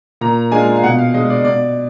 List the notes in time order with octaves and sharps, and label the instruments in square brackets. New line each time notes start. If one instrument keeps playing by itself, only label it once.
[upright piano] A#2 A#5
G#3 D4 F4 G#5
F5
B2 F#5
F5
G#3 D4 D#5
D5
B2 D5